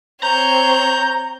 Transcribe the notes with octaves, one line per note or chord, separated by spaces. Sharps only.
C4 C#5 A#5 G6